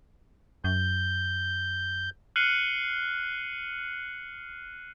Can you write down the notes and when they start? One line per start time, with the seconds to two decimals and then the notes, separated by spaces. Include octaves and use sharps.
0.64 F#2 G6
2.36 F6 F#6 C7 C#7 D#7 F#7